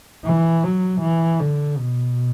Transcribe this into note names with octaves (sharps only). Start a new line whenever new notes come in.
E3
F#3
E3
D3
B2